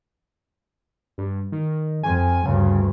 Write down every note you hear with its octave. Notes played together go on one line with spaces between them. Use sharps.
G2
D#3
F2 G#5
D2 G2 C#3